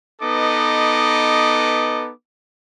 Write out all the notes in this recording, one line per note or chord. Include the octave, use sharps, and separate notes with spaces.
B3 D#4 A4 B4 D#5 D6